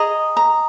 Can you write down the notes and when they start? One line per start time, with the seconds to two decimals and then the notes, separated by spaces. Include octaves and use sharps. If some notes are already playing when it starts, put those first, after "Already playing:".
Already playing: G#4 D#5 A#5
0.37 A#5